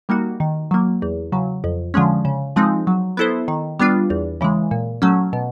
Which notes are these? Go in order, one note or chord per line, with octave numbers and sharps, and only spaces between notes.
G3 A#3 D#4 F#4
D#3
F#3 A#3
E2
C#3 F#3
F2
D3 F3 G#3 C#4
C#3
F3 G#3 C4 D#4
F#3
B3 E4 A4 C5
D#3
G3 B3 D4 F4
E2
C#3 E3 G#3
A#2
F#3 A3 C#4
B2